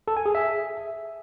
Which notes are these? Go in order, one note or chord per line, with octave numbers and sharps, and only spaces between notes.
A4
G#5
G#4
E5